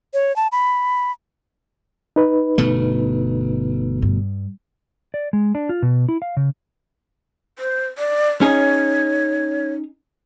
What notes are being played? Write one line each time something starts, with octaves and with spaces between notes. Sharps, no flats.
C#5
A5
B5
D#4 B4
G1 B2 A3
G2
D5
G#3
D4
F4
B2
E4
F5
C#3
C5
D5
C#4 D#4 G#4 C#5